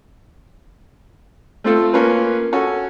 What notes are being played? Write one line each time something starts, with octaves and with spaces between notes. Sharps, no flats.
A3 C4 F4 A4
A#3 C#4 F4 B4
C#4 F#4 A4